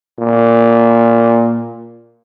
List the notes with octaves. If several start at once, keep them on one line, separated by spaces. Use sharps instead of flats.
A#2